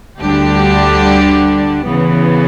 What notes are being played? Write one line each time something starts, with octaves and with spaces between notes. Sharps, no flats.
D2 D3 G3 D4 G4
C#3 E3 B3